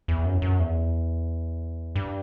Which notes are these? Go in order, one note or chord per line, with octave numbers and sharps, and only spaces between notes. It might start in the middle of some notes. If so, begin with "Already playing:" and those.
E2
F#2
F#2
E2
G2